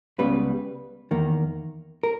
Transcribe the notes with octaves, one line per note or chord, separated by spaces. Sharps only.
C#2 C#3 G3 B3 B4
E2 D#3 A#3
A#4